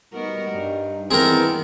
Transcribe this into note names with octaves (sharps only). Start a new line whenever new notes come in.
G3 B3 D#4 F#4 A#4
G2
D#3 E3 B3 C4 G#4 A#4